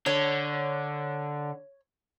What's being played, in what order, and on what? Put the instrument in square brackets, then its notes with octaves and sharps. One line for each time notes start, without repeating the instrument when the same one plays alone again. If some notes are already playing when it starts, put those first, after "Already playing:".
[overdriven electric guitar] D3 [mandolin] C#5